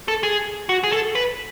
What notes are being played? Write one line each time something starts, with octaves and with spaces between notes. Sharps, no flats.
A4
G#4
F#4
G#4
A4
B4